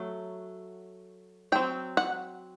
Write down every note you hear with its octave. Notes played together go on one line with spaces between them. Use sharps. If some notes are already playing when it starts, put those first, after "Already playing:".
Already playing: F#3 A3
F#3 C4 G5
F#5